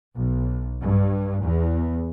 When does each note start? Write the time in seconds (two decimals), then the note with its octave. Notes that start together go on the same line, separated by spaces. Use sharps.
0.13 B1
0.82 G2
1.44 E2